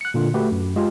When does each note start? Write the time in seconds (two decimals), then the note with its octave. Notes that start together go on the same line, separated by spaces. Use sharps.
0.01 F#6 C#7
0.14 A#2 D3 F4
0.34 A3 F#4 G4 B4
0.52 F#2
0.76 G#3 F4 G4 G#4